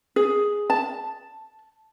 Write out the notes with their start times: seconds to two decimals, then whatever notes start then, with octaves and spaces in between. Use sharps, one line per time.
0.16 G#4
0.70 A5